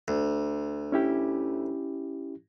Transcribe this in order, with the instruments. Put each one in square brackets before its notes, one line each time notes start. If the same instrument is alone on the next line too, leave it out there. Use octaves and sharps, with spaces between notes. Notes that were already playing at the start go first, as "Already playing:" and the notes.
[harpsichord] D2
[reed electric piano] C#4 E4 G4